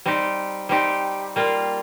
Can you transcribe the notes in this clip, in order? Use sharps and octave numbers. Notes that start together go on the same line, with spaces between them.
G3 C4 D#4 G4
G3 C4 D#4 G4
G3 A#3 F4